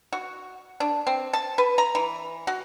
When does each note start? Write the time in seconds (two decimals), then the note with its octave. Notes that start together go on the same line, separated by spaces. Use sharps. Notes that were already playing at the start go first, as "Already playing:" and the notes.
0.13 F#4
0.80 D4
1.07 C4
1.33 A5
1.58 B4
1.78 A#5
1.95 E3
2.47 F#4